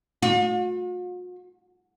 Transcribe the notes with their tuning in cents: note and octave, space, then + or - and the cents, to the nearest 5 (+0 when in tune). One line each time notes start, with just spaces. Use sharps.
F#4 -45